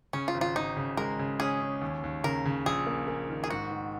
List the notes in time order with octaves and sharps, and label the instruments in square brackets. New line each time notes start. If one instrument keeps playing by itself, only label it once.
[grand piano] C#3 [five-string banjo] C#4
[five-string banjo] F4
[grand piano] G#1
[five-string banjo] F4
[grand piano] G#1 [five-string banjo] D#4
[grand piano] C#3
[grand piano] G#3 [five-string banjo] A#4
[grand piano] C#3
[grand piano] C#4 [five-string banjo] G#4
[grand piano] C#4
D#2
D#2
[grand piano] C#3 [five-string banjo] A#4
[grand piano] C#3
[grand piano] A#1 [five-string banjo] G#4
[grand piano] A#3
A#3
D#3
[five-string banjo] G#4
[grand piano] G#2 [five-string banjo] F#4
[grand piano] D#3